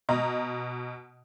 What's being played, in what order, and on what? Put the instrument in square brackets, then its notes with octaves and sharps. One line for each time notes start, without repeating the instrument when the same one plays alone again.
[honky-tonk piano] B2 D#5 A#5